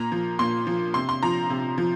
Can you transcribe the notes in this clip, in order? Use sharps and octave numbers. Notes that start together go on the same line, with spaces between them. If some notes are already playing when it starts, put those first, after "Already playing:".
Already playing: A#2 A#5
F3
A#2 C6
F3
C3 C6
C6
F3 A#5
C3
F3